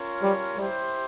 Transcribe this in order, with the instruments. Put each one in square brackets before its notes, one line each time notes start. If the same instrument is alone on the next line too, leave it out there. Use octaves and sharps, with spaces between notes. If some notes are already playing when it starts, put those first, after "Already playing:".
Already playing: [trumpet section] C#4 F4 A#4 C#5
[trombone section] G3
[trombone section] G3 [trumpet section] E4 G4 C5